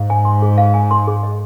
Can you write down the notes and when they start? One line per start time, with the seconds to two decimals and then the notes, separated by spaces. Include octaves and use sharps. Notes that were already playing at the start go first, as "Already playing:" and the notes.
Already playing: G#2 F5
0.10 G#5
0.25 C6
0.42 G#4
0.58 F5
0.74 G#5
0.91 C6
1.07 G#4
1.23 D#5